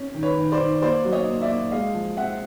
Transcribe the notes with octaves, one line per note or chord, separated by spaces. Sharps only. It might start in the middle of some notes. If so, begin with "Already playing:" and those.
Already playing: C#4
D#3
B4 C#5
D#3
C5 D5
D#3
A#3 C5 D5
F#3
C#5 D#5
A#3
D5 E5
A#3
G#3 D#5 F5
F3
C4 E5 F#5